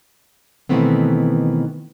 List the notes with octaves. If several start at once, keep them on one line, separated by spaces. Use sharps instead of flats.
B2 D#3 E3 A3 B3 C4